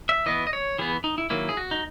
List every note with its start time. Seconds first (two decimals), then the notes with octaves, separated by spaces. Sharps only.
0.09 E5
0.26 E3 B3 D#5
0.47 D#5
0.53 C#5
0.79 E3 B3 G#4
1.04 D#4
1.18 E4
1.30 D#3 F#3 A#3 E4
1.49 G#4
1.57 F#4
1.71 D#4